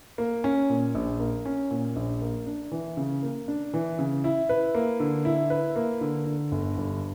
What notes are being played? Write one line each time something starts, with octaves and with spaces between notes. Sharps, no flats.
A#3
C#4
A#2
A#1
A#3
C#4
A#2
A#1
A#3
D4
E3
C#3
A#3
D4
E3
C#3
E4
B4
A#3
D3
E4
B4
A#3
D3
D3
G1
G2